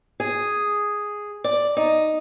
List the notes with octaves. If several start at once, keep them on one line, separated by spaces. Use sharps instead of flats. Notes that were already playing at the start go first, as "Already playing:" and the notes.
G#4
D5
D#4